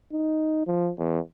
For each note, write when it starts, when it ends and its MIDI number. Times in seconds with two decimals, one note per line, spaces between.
0.12 0.66 63
0.67 0.90 53
0.98 1.19 40